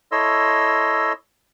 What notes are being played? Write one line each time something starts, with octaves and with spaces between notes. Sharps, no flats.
E4 A4 C#5 D#5 C6 E6